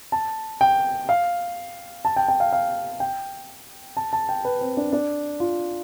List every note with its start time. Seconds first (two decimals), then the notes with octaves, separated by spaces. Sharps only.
0.12 A5
0.61 G5
1.09 F5
2.05 A5
2.16 G5
2.28 G5
2.40 F5
2.53 F5
3.00 G5
3.97 A5
4.13 A5
4.29 G5
4.45 B4
4.61 C4
4.77 D4
4.93 D4
5.40 F4